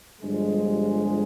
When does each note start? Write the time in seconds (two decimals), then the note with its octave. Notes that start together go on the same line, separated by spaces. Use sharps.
0.21 G1 G2 F3 G#3